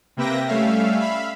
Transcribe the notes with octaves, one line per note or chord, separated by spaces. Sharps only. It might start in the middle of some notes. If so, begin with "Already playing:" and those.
C3 A#3 B4 E5 G5 A#6
G3 A3 C#4 E5 F5
E5 F5 B5